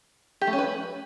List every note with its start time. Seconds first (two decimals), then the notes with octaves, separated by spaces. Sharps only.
0.41 G4
0.47 A3
0.53 C#4
0.59 B4